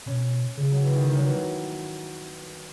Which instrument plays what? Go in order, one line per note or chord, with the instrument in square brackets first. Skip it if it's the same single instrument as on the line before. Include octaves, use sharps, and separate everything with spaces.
[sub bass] B2 [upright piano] C#4
[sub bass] C#3 [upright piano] G#3
[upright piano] F#3
E3
D#3
D#3
F#3
E3
F#3